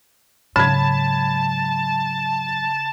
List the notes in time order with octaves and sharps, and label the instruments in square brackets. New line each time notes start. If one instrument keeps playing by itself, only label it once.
[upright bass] G#2 F#3 [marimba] C#3 [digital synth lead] A5 [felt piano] B5 G#6